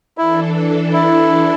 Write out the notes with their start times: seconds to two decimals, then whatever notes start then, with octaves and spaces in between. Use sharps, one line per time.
0.17 E3 D4 E4 A4
0.93 E4